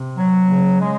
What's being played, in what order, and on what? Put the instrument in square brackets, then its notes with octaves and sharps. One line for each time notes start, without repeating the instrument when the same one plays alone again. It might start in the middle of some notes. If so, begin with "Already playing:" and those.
Already playing: [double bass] C3
[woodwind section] F#3
[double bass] C#3
[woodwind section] G#3